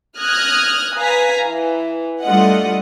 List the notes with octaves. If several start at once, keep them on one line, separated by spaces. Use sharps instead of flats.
D#6 F6 F#6 G#6 A#6
B4 F5 G#5 A#5 B6
E3
G3 A3 D4 F4 D#5 F#5